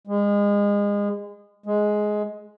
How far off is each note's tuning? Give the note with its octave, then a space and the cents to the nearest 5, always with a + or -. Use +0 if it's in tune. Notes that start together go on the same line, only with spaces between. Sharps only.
G#3 -30
G#3 +10